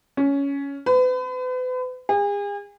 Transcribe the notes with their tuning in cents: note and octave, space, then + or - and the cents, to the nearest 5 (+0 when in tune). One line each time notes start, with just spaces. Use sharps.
C#4 +10
B4 +40
G#4 -40